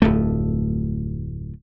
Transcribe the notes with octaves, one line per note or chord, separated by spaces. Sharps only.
D1 F2 A3